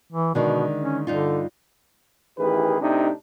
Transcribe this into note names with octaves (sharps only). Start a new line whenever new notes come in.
E3
B2 D3 D#3 G#3
C#4
G2 D3 D#4 F4
A1 D#3 E3 G4 G#4 B4
A2 C3 D4 D#4